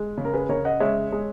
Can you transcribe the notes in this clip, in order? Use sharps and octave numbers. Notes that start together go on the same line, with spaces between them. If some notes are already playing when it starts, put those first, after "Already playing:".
Already playing: G#3
C#3
A#4
G#4 B4
C#3 A#4 C#5
D#5 F#5
G#3 C#5 E5
G#3